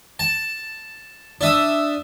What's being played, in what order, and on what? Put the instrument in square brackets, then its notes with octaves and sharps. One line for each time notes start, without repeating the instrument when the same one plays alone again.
[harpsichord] A5
D4 E5 D#6